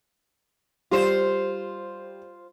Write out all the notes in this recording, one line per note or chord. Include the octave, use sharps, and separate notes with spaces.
G3 F4 C5